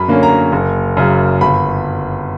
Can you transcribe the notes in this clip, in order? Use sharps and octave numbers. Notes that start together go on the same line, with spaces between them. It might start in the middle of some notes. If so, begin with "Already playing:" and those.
Already playing: F#2 B5
D3 A#3 C#4
A#5
F#1
F#2 C#3
G1 B5